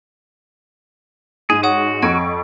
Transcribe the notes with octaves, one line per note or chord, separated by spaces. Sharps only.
G#2 G#4 D#7
F#4 C#5 F#5 D#6
F2 D#5 C#6 G#6 D7